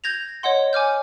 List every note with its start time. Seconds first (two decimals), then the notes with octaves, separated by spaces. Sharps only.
0.04 G6 G#6 A#6 F7
0.43 C#5 D#5 F#5 C6
0.73 G#5 D6 F6 G6